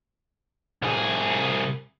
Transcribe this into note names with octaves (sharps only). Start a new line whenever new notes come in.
C2 G#4